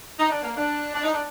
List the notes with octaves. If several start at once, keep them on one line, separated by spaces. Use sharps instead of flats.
D#4
D4
A#3
D4
D4
D#4
D4